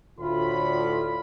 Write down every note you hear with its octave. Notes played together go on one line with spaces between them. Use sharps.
D2 A2 D3 F4 B5